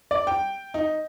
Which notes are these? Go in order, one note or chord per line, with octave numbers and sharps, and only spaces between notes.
D5
G5
D#4